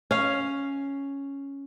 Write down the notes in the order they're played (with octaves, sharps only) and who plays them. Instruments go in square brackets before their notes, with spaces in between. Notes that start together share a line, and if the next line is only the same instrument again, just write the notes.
[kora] C#4 F5